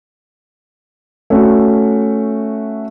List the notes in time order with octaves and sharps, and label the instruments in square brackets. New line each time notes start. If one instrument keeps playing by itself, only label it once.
[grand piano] A3 C#4 F#4